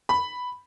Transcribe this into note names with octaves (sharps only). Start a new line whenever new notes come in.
B5